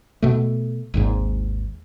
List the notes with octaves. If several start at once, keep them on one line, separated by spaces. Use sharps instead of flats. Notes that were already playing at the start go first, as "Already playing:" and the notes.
B2 A3
G#1 D#2 G#2